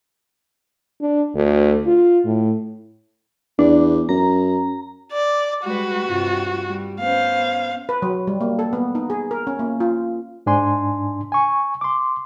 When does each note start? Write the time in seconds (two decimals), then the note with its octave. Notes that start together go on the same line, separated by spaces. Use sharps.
1.01 D4
1.35 D2
1.86 F4
2.25 A2
3.59 E2 D4
4.09 F#2 A#5
5.12 D5
5.64 G3 G#3 F#4 B4
6.07 G2 C3 F4
6.69 G3
7.00 B3 C#4 C5 F5
7.89 B4
8.02 F#3
8.27 G3
8.41 A#3
8.59 A4
8.73 B3
8.95 D#4
9.10 G#4
9.31 A#4
9.47 C#4
9.59 A#3
9.80 F4
10.46 G#2 D4 G#5 C6
11.32 G#5 C#6
11.81 C6 D6